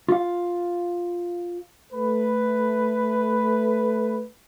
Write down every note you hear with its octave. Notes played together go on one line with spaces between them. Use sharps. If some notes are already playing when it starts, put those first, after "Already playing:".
F4 F5
A3 B4